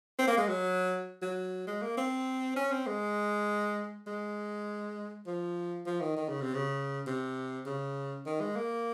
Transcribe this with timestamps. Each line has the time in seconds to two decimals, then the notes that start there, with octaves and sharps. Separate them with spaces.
0.19 C4
0.28 A#3
0.38 G#3
0.48 F#3
1.22 F#3
1.67 G#3
1.82 A#3
1.97 C4
2.56 C#4
2.71 C4
2.87 G#3
4.07 G#3
5.27 F3
5.86 F3
6.01 D#3
6.17 D#3
6.29 C#3
6.41 C3
6.55 C#3
7.07 C3
7.66 C#3
8.26 D#3
8.41 G#3
8.56 A#3